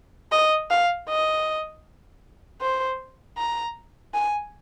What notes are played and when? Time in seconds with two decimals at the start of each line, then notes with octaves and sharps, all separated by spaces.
0.32 D#5
0.70 F5
1.09 D#5
2.62 C5
3.38 A#5
4.14 G#5